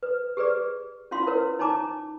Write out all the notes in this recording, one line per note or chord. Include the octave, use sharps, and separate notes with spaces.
B4
G4 G#4 B4 D5
C#4 E4 F4 F5 C6
E4 A#4 B4 C#5 F5
D#4 C#5 G#5 A#5 D6